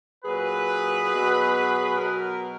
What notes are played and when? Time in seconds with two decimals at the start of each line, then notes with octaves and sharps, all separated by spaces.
0.24 A#2 F#3 G#4 B4
1.10 B2 F#3
1.96 B2 F#3 F#4 A#4